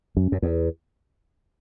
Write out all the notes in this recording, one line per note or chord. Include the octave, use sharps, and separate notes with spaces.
F#2
F#2
E2